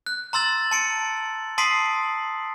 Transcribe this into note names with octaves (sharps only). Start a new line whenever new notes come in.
F#6
A#5 C6 E6 A6 F#7
A5 C#7 D7
A5 C6 D#6 B6 C7 D7